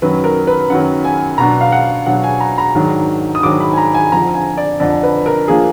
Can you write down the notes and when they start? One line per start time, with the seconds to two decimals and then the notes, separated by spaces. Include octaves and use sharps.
0.02 F#2 D#3 F#3 B4
0.24 A#4
0.47 B4
0.70 F#2 D#3 F#3 F#5
1.04 G#5
1.38 B2 F#3 D4 A#5
1.61 F5
1.72 F#5
2.06 B2 F#3 D4 F#5
2.24 G#5
2.40 A#5
2.58 A#5
2.75 G#2 D#3 F#3 D4
3.35 D#6
3.43 G#2 D#3 F#3 D4 D6
3.60 B5
3.73 G#5
3.78 A#5
3.94 G#5
4.12 F2 D3 F3 A#5
4.34 G#5
4.58 D5
4.80 F2 D3 F3 D5
5.03 B4
5.26 A#4
5.48 F3 A#3 D4 G#4